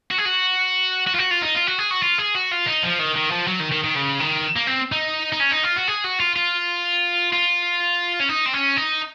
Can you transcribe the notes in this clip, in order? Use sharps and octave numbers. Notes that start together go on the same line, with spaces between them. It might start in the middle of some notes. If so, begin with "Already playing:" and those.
F#4
G#4
F#4
F#4
F4
F#4
F4
D#4
F4
F#4
G#4
F#4
F4
G#4
F#4
F4
D#4
F3
D#3
D#3
F3
F#3
D#3
D#3
D#3
C#3
D#3
A#3
C4
D#4
D#4
C#4
D#4
F4
F#4
G#4
F#4
F4
F4
F4
C#4
D#4
C4
C#4
D#4